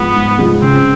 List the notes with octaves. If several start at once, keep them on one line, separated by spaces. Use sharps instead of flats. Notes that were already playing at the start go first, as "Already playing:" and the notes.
Already playing: G#2 F3 G#3 B3
G#2
F3 G#3
C#3 C4